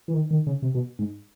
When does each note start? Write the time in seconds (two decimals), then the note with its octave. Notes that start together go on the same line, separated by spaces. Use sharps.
0.08 E3
0.14 D#3
0.31 D#3
0.47 C#3
0.62 C3
0.75 B2
0.99 G#2